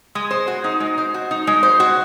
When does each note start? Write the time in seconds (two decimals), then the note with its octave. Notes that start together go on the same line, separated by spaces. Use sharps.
0.15 G#3
0.31 C5
0.47 F#4
0.64 D#4
0.80 G#3
0.98 C5
1.14 F#4
1.31 D#4
1.47 G#3
1.63 C5
1.80 F#4